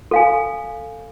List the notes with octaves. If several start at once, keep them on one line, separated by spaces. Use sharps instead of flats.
A4 F5 G#5